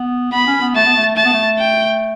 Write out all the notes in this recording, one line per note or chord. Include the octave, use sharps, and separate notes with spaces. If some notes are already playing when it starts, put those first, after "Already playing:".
Already playing: B3
B3 B5
C#4
B3
A3 A5
B3
A3
A3 A5
B3
A3
G5